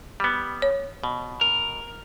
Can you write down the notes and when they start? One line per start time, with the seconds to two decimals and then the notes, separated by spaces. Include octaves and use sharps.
0.20 G3 B3
0.62 C#5
1.04 B2
1.41 A#4